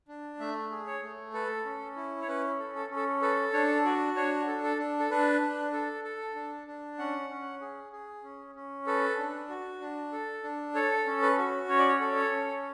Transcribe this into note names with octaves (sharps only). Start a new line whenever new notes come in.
D4
A3 E5
G#4
C#5
A3
A4 B4
C#4
E4
C#5
C#4 B4
A4
A4
C#4
A4
A4 B4
D4 C#5
F#4 D5
D4 C#5
A4
A4
D4
A4
D4 B4
D4
A4
A4
D4
D4
C#4 F#5
C#4
G#4
G#4
C#4
C#4
A4 B4
D4
F#4
D4
A4
D4
A4 C#5
C#4
B4
F#4
C#4 C#5
D5
C#5
A4
C#5
C#4